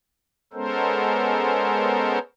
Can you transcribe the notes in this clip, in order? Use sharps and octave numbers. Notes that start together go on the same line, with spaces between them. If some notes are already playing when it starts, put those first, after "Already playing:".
G#3 B3 C#4 A4 A#4 C5